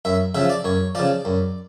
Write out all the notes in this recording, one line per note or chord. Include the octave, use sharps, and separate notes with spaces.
F#2 E5
C#3 F3 E5
D5
F#2 C#5
C#3 F3 D5
F#2